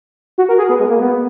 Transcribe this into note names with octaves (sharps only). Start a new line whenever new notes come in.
F#4
A#4
G#4
B3
G#3
A#3
B3